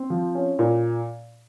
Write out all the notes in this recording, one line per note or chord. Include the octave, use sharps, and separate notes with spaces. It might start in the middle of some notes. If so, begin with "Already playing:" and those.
Already playing: C4
F3
C#4
A#2